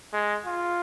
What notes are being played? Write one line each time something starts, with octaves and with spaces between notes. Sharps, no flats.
G#3
F4